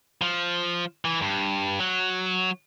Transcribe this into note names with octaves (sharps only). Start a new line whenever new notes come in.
F3
E3
G2
F#3